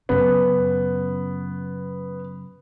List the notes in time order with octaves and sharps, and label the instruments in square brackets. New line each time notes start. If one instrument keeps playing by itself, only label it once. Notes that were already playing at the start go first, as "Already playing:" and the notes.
[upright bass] F#2 C#3 [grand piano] B3